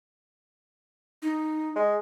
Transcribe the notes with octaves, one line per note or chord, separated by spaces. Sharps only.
D#4
G#3